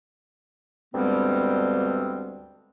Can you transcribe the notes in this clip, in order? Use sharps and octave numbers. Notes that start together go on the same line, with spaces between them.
D2 G2 G3 G#3 B3 C4